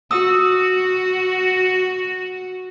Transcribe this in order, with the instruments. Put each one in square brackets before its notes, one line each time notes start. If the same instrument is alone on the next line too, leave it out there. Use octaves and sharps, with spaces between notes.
[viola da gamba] F#4 [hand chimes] D#6 E6